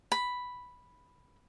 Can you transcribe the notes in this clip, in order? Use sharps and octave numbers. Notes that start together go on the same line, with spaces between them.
B5